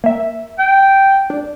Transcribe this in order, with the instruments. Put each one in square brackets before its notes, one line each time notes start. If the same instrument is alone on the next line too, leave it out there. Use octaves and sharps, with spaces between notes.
[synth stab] A#3 E5
[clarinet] G5
[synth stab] D4